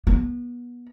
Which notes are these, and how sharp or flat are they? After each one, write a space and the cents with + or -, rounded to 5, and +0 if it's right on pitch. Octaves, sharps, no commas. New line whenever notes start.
B3 -30